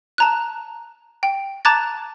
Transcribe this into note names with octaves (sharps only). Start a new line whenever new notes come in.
A5 A#5 F#6
G5
A5 A#5 D6 F#6 G#6 A6